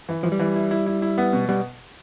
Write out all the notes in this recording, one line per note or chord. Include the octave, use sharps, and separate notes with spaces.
E3
E3 F3
G3
E3
E4
E4
E4
E4
B3
B2
G3 B3